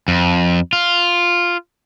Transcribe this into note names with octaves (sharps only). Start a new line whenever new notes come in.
F2
F4